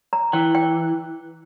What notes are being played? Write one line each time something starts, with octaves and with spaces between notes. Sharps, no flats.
A#5
E3 G5
G5